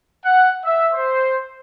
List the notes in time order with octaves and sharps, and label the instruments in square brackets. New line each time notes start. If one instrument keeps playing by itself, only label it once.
[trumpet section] F#5
E5
C5